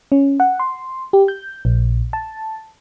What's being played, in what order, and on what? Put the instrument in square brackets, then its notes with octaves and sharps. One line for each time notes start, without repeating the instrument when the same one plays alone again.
[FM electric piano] C#4
F#5
C6
G4
G6
A#1
A5